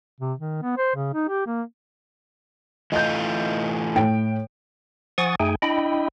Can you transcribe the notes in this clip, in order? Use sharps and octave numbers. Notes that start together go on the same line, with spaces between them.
C3
D#3
B3
C5
C#3
D#4
G4
A#3
E3 A3 F4 D#5 G6
A2 G5 D7
F3 F#5 G#5 C#6 D#6 A6
F#2 A3 D#4 G#4 G5 G#5
D4 E4 D#5 G5 B5